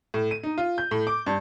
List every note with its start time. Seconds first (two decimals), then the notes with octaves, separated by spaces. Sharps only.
0.14 A2
0.31 D#7
0.43 D#4
0.58 F4
0.78 G6
0.91 A2
1.07 D6
1.26 G2